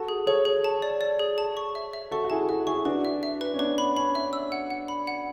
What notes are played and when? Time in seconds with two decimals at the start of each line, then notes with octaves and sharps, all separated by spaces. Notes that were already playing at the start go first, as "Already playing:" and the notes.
Already playing: F#4 A4 A5
0.08 G#4
0.27 G#4 A4 C#5
0.45 G#4
0.64 A5
0.82 D5
1.01 D5
1.19 G#4
1.38 A5
1.57 C#6
1.75 E5
1.93 E5
2.11 F#4 A4 C#6
2.24 F#4
2.30 E4 G#4 A5
2.49 F#4 A4 E5
2.67 E4 G#4 C#6
2.85 D4 F#4 B4
3.05 E5
3.23 E5
3.41 B4
3.54 C#4
3.59 B3 D4 B4
3.78 B5
3.96 C#4 B5
4.15 E5
4.33 E6
4.52 F#5
4.70 F#5
4.88 B5
5.07 F#5